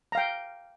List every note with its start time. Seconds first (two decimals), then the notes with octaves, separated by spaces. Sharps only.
0.12 A#5
0.15 F5
0.18 G5